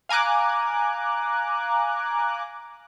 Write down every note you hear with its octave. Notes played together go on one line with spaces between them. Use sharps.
F5 G#5 A#5 D6 F#6